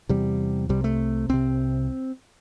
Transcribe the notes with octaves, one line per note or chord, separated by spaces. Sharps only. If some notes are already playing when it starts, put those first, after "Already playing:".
E2 C3 G3
C2 C3 G3
A3
C2 C3 C4